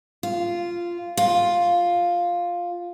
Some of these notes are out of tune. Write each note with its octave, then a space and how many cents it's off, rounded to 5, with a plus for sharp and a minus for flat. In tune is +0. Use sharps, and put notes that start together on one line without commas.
F4 -10
F4 +5